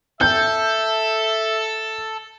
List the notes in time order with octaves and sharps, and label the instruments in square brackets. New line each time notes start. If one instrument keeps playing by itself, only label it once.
[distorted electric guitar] A4 [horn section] E5 [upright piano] G6